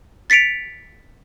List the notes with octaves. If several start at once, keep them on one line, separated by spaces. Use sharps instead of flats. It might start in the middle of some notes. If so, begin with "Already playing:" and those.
A6 B6 C#7 D7 F7